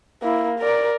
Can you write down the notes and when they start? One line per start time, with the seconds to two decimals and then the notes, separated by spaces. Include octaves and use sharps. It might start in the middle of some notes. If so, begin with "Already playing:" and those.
0.22 A#3 E4
0.59 A#4 D5